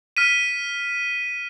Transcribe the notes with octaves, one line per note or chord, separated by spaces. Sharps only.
F6 B6 D#7